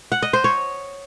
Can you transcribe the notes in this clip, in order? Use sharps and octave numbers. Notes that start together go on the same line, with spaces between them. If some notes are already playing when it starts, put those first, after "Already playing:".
F#5
D#5
C5
C#5